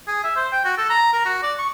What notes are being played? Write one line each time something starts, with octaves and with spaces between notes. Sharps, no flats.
G#4
E5
C5
G5
F#4
A4
A#5
A#4
F#4
D5
C#6